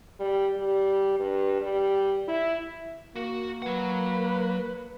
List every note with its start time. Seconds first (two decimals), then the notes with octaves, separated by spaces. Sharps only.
0.20 G3
0.57 G3
1.20 G2
1.61 G3
2.28 E4
3.16 A#3 F#4
3.62 F#3 B4 F#5